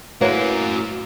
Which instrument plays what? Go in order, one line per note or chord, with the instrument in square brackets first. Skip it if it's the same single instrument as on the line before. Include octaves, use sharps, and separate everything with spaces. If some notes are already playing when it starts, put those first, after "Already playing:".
[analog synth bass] A2 [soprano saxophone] A#3 [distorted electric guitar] F#4 A#4 [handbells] B4 C#5